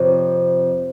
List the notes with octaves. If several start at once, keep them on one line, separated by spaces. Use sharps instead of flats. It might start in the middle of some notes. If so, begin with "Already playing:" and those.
Already playing: F2 C3 F3 C#5 D#5